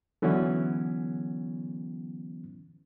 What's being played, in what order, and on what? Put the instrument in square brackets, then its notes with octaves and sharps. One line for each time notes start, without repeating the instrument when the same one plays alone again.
[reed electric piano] D3 E3 F#3 B3 C#4 E4